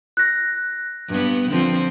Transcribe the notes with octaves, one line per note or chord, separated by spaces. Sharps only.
F#6 A#6
G2 B3
D3 F3 C4